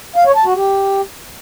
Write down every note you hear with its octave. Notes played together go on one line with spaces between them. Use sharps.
F5
C#5
A5
F#4
G4